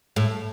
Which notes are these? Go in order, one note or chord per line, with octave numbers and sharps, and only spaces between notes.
A2